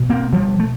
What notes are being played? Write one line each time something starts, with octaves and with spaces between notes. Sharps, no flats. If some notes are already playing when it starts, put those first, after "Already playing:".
Already playing: B2
A#3 C4
F3 G3
A3